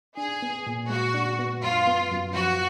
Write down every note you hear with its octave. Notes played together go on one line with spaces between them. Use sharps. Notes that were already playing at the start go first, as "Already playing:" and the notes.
D4 G#4
B3
A#2
G#3 F#4
D4
B3
F#2 F4
B3
F#2
F3 F#4